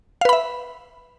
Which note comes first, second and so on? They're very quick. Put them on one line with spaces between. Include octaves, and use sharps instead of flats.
F5 B4 B5 E5